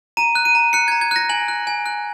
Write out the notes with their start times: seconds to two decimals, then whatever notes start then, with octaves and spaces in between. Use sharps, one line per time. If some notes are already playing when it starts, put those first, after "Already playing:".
0.17 A#5 D#7
0.35 F#6
0.45 D#7
0.55 A#5
0.73 F#6 C#7
0.88 A#5 G#6
1.01 G#6
1.11 F#6 A#6
1.29 G#5 F#7
1.48 F#6
1.67 G#5
1.86 F#6